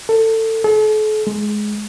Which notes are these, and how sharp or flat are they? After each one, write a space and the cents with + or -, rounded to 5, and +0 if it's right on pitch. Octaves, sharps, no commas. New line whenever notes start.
A4 +20
A4 -45
G#3 +15